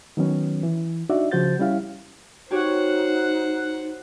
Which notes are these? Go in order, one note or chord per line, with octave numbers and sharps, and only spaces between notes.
D#3 F#3 B3 C#4
E3
D4 D#4 F#4 D5 E5
C#3 F3 F#4 C5 G6 A6
G3 C#4 E4 G4 F5
D#4 F#4 G4 C5 C#5 F#5